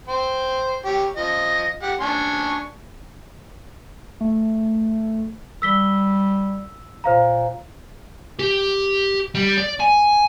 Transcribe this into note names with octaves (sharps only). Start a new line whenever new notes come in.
C5 G5
G4 C#5
F3 D#5
G4 F#5
D4 G#5 C#6
A3
G3 E6 B6 G7
A#2 C5 F5 A#5
G4
G3
D5
G#5